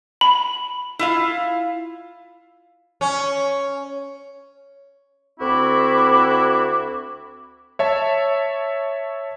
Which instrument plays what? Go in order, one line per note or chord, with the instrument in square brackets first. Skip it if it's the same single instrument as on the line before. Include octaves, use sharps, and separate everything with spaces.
[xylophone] B5
[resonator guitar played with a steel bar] E4 F4 F5
[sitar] C#4
[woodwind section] D2 C4 E4 F#4 D6
[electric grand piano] C#5 E5 A5